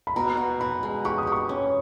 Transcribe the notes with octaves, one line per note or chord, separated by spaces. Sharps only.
B5
B2 A#5
B2
B2 B5
G#3
G4 C#6
D#6
G4 C#6
C#4